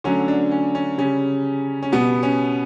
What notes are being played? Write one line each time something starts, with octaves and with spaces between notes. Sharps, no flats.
D3 F#3 A3 C#4
D4
C#4
C#4
C#3 G3 C#4
C#4
B2 G3 B3
C#4